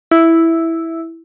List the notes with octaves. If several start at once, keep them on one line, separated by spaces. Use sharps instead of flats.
E4